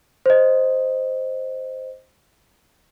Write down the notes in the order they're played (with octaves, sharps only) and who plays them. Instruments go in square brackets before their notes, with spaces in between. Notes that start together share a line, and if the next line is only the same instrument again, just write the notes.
[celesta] C5 D#5